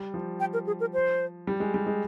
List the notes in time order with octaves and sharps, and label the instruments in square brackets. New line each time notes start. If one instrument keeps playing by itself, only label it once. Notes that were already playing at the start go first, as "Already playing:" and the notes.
Already playing: [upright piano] G3
F3
[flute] G5
A#4
G#4
A#4
C5
[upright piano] G3
G#3
G3
G#3